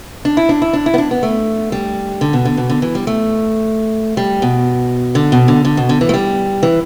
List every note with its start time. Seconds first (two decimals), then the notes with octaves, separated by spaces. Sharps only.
0.25 D4
0.37 E4
0.49 D4
0.62 E4
0.73 D4
0.86 E4
0.94 B3
0.98 D4
1.11 B3
1.23 A3
1.72 G3
2.21 D3
2.33 B2
2.45 D3
2.57 B2
2.69 D3
2.82 E3
2.95 G3
3.07 A3
4.17 G3
4.42 B2
5.15 D3
5.32 B2
5.48 D3
5.65 D3
5.77 B2
5.89 D3
6.01 E3
6.09 A3
6.14 G3
6.63 E3